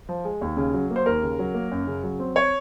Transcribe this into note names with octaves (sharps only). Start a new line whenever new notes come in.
F3
G#3
D#2
C#3
F#3
A#3
C5
D#2 A#4
C#3
F#3
A#3
F#2
C#3
F#3
C4
C#5